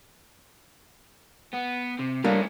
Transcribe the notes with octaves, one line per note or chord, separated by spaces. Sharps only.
B3
C3
G3 A3 A#3 C#4 D4